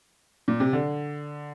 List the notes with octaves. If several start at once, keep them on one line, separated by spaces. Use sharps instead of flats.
A#2
C3
D3